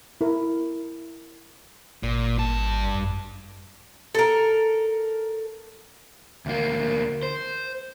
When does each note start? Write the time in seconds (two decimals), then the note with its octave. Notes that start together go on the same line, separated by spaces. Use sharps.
0.21 E4 A#4
2.03 G#1 A#2
2.38 G2 A5
2.95 F#2
4.15 A4 A#4
6.46 D2 A#3
7.23 C5